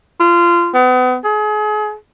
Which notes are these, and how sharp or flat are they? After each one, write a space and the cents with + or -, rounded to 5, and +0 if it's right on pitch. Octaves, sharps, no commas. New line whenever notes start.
F4 -25
B3 +35
G#4 +35